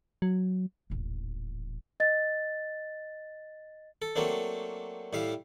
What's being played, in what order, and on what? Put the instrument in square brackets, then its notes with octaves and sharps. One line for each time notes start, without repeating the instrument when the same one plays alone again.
[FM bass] F#3
[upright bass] D#1 A1
[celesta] D#5 A6
[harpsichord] A4
F#3 A3 A#3 C4 D4
A2 G3 E5 F5